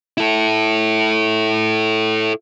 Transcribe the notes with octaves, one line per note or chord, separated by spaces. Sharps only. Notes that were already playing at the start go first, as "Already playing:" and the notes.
E4 A4